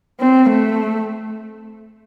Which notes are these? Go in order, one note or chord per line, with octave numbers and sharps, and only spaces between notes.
C4
A3